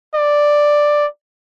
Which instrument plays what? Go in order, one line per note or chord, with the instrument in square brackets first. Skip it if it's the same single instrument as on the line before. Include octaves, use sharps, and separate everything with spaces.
[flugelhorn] D5